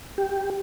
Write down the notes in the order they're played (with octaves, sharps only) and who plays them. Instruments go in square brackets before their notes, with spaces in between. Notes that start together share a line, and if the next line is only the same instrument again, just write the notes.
[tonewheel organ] G4